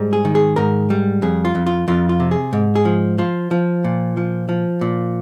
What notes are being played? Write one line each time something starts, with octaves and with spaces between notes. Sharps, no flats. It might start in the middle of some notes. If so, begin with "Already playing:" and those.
Already playing: G#2 G3
G#4
D#3
G#4
G#2 A#4
G3
F2 G#4
F4
F2
F4
F2 F4
F4
C3
G#4
G#2
G#4
F3
F3 F4
F3
A#2
F3
F3
A#2